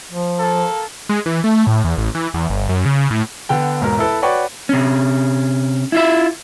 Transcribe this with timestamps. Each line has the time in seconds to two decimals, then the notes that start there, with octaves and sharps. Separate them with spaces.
0.11 F3
0.39 A#3 A4
1.09 G#3
1.26 E3
1.44 A3
1.67 A2
1.84 E2
1.98 A1
2.15 E3
2.34 E2
2.50 G1
2.69 F#2
2.86 C#3
3.11 A2
3.49 D3 B3 G5
3.81 E1 G#2 B2 A#4
3.98 E4 A4 B4
4.22 F#4 B4 C#5 D5 G5 C#6
4.69 C3 C#4
5.92 E4 F4 E5